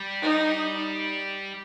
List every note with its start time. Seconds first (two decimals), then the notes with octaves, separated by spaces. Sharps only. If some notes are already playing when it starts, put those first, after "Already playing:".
Already playing: G3
0.22 D#4